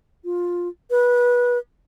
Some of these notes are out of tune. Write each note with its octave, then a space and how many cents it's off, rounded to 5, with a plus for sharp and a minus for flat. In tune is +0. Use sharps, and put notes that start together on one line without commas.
F4 +10
B4 -20